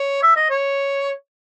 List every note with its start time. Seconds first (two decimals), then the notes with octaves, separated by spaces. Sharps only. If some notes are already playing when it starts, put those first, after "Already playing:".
Already playing: C#5
0.23 E5
0.36 D#5
0.50 C#5